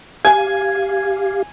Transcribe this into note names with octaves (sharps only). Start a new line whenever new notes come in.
G4 F5 G#5